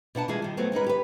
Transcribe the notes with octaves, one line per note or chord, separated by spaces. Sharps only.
B2 D4 F#5 A5
E3 G3 G#3 F4 G#4
D#3 G3
F#3 A3 B3 C4
G#3 C#4 D#4 B4
G4 B4